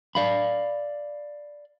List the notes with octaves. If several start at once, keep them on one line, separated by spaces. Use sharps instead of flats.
D5 F5 B5